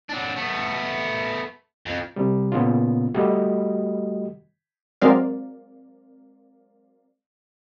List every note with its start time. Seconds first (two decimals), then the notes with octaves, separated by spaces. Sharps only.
0.09 F#3 D4
0.36 A3 B3
1.86 F2
2.16 C3 G3
2.52 A#2 C#3 B3 C#4 F4
3.14 G3 A3 F#4 G4 D#5
5.01 F#3 G#3 C4 A#4 D5 F5